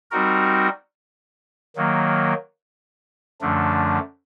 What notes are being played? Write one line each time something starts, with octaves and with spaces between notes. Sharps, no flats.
G3 C4 D#4 F#4 A#4
D#3 F#3 A#3
F#2 D3 F3 A3 D4